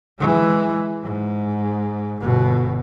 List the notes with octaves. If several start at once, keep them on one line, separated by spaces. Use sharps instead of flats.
E3 G#3
G#2
G1 B2